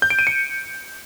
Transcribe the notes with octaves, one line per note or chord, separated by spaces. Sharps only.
G6
D7
D#7
C#7